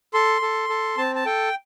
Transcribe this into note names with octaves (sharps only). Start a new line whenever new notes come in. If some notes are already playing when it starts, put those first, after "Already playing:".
A4 C6
A4
A4
C4 A5
A5
A4 G5